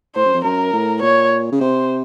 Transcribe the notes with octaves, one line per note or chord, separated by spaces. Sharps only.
A2 C5
F#2
F2
F#2 A#4
A2
A#2 C#5
C#3
C3 C5